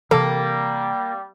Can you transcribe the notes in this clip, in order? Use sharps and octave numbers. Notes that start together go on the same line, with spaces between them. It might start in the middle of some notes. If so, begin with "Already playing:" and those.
C3 E3 G3 A#3 A4